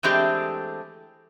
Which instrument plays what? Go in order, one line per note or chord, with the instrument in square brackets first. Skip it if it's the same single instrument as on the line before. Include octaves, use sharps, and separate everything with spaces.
[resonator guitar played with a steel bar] E3 G#3 A3 C4 D4 G4